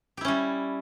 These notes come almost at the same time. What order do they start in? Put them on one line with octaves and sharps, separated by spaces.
G4 E4 C#4 G3